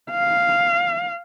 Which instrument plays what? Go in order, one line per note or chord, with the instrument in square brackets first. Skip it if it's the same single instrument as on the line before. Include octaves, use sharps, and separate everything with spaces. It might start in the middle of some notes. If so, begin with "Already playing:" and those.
[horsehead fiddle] F5